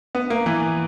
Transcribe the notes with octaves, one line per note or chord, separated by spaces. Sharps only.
B3
A#3
E3